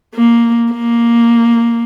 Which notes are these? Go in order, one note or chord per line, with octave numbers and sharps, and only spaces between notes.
A#3
A#3